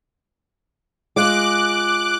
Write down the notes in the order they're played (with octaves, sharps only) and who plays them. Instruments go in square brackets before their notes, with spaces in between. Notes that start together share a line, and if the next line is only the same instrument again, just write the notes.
[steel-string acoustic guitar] G#3 F4 [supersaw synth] D6 F#6